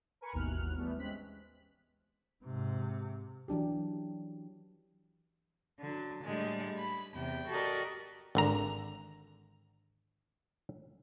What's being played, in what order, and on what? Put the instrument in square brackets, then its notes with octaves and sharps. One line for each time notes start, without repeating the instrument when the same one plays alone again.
[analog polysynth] A#4 B4 G#5 C#6
G#1 D#2 B2 E3 F6 F#6
E3 G3 A3 B3
G#3 C4 C#4 F#6 B6
[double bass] G#2 C3
[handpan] E3 F#3 D4 G4
[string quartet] D3 F#3
A2 D3 G3 G#3
B5
E2 C3 G5
F#4 G4 A4 A#4 D5 D#5
[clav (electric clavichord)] G#1 D3 A#5